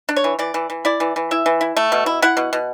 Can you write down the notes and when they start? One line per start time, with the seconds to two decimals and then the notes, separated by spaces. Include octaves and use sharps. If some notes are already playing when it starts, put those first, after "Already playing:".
0.09 D4
0.16 C#5
0.24 E3
0.39 E3 D5
0.54 E3
0.70 E3
0.85 E4 D5
1.00 E3
1.16 E3
1.31 E4 E5
1.46 E3
1.61 E4
1.77 A3
1.92 B2
2.06 E4
2.22 E4 F#5
2.37 B2
2.53 B2